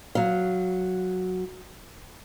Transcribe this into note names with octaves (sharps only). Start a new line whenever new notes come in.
F#3 F5